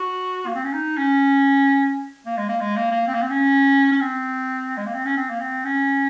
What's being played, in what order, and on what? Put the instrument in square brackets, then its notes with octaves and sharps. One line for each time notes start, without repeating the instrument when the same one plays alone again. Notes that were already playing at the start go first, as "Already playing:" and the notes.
Already playing: [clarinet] F#4
A#3
C4
C#4
D#4
C#4
A#3
G#3
A#3
G#3
A#3
A#3
C4
A#3
C4
C#4
C#4
C4
G#3
A#3
C4
C#4
C4
A#3
C4
C#4